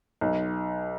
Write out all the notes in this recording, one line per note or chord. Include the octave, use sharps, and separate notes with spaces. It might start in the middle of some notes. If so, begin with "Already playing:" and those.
B1